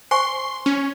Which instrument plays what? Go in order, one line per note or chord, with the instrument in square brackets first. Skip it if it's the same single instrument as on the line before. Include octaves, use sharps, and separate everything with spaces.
[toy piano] C5 G#5 C#6 [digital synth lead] C6
[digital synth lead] C#4